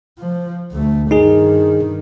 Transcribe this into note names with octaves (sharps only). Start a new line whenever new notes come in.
F3
D2 A3
G2 D#3 D#4 G#4